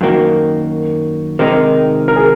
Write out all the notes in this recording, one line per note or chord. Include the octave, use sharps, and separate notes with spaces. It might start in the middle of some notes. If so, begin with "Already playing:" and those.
F#2 D#3 A#3 F#4
C3 D#3 G#3 D#4 A#4
A#4
G#4